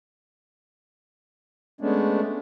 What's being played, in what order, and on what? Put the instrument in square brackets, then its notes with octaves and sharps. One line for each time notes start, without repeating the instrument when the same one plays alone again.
[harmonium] G#3 A3 B3 C#4 D4